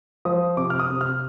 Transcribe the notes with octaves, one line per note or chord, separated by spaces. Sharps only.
F3 D#6
C3 D6
F6
D#6
C3
F6